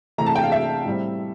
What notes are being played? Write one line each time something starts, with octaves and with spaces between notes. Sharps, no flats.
C3 E3 A3 A#5
A5
G5
F5
E5
A2 G3 C4